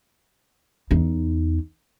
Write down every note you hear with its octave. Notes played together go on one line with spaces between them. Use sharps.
E2 D#4